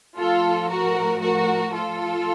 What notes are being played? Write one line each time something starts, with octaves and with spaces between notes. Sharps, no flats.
A2 F3 A3 F4 A4
F#4 A#4
F#4 A#4
F4 A4